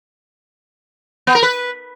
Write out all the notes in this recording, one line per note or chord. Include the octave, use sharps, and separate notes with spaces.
B3
A#4
B4